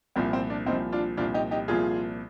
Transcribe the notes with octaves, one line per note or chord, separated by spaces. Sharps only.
C2 A#2 F3 C4
C4
D4
C2 A#2 F3 C4 D#4
D4 F4
C2 A#2 F3 D4 F4
D#4 G4
D#4 G4
C2 A#2 F3 F4 G#4